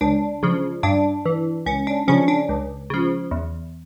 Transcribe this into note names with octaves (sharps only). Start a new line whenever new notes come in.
C#2 D4
C#3 F3
G2 D4
E3
C#2 C#4
D4
C#3 F3 C#4
D4
C#2
C#3 F3
E2